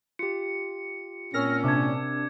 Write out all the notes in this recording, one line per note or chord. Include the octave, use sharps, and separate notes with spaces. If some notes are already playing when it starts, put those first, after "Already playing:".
F4 G4 C#7
A#2 C4 C#4 A#4 E6 F6 A#6
C3 D4 D6 G#6